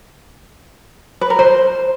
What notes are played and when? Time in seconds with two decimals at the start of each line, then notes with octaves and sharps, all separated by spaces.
1.21 B4
1.30 A#4
1.39 C5